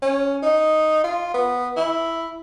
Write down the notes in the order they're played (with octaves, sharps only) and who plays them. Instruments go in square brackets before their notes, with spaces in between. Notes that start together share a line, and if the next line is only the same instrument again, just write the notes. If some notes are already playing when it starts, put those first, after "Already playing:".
[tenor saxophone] C#4
D#4
F4
B3
E4